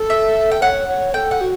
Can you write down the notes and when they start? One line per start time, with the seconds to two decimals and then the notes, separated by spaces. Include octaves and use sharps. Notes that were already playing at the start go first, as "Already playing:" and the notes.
Already playing: A4
0.10 E5
0.51 G5
0.61 C#5 F#5
0.88 C#5
1.14 A4 G5
1.31 F#5
1.41 F#4